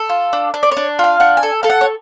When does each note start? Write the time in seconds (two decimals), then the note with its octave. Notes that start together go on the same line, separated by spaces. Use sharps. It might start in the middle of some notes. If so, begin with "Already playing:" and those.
Already playing: A4
0.10 F4
0.33 D4
0.54 D4
0.63 D5
0.71 C#5
0.77 D4
0.99 F4 F5
1.20 D4 F#5
1.37 G#5
1.43 A4
1.63 A4 F5
1.70 F#5
1.81 C#5